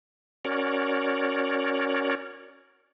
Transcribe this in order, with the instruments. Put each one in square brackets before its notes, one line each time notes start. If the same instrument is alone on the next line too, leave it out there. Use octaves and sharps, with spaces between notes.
[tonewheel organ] C#4 F#4 A#4 C#5 D5